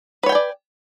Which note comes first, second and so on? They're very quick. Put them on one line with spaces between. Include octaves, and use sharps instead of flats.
B4 C#5 G5 G#5 D5